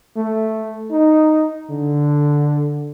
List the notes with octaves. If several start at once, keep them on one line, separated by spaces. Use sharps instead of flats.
A3
D#4
D3